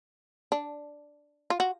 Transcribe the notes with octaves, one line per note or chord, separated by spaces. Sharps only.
D4
F4
F#4